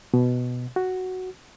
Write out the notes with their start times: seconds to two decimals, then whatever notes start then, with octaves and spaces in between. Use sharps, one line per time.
0.14 B2
0.76 F#4